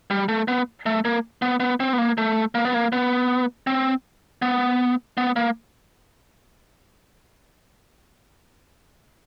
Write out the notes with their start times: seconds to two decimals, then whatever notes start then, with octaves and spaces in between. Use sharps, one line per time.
0.11 G3
0.28 A3
0.48 B3
0.86 A3
1.05 A#3
1.42 B3
1.60 B3
1.80 C4
1.93 B3
1.98 A#3
2.18 A3
2.55 A#3
2.65 B3
2.74 A#3
2.92 B3
3.67 C4
4.42 B3
5.17 B3
5.36 A#3